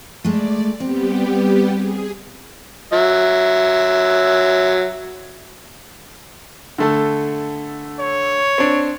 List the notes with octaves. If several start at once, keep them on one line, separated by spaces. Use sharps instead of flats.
G#3 A3 D5
G3 B3 C4 G4
G#4
F#3 E5
D3 A3 A4
C#5
C4 D4